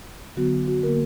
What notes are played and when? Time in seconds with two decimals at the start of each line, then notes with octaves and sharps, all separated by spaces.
0.36 D3 F#3 B3 F#4
0.68 F#4
0.83 D3 A#3 A#4